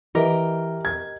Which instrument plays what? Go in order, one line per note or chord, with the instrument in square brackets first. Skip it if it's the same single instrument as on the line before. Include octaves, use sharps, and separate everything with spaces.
[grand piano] E3 [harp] G4 A#4 D#5
[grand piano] G#6